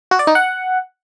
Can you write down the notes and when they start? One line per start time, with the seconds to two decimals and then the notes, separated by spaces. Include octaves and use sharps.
0.11 F#4
0.19 D5
0.27 D#4
0.35 F#5